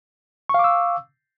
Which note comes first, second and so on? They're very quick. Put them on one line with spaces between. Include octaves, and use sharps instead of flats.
C#6 F5 D6 E6